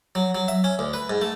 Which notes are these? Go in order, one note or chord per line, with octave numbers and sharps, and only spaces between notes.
F#3
F#3
E5
C#4
D2
B4
G#2
A3